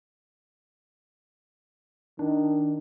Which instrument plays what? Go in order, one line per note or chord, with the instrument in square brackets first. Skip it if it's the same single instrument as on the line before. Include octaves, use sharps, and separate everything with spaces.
[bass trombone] D#3 [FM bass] D4